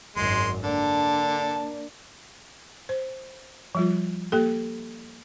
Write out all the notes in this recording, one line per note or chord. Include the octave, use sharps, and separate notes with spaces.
G#1 F#2 G#3 C6
D3 A#3 D4 A5
C5
F3 G3 F4
A#3 G4 A4